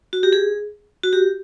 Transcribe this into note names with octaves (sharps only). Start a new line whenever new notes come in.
F#4
G4
G#4
F#4
G4